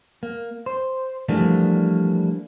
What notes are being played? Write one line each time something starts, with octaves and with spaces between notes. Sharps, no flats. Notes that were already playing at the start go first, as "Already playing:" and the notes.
A#3
C5
E3 F3 G3 A3 A#3 D4